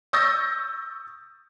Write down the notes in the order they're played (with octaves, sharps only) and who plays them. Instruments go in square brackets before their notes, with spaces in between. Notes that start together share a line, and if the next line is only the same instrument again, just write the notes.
[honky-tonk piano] C#6 D#6 E6 G6 A6 A#6